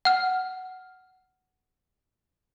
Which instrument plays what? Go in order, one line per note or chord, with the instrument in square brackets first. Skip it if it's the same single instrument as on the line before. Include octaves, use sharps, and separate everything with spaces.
[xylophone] F#5 F6